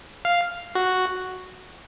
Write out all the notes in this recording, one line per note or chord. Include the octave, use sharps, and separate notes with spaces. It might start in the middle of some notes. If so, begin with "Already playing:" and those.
F5
F#4